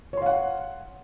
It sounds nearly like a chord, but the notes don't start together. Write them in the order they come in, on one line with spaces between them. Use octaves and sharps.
C#5 C6 F5 F#5